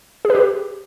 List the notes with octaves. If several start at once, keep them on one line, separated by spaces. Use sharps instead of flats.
G#4
B4
G4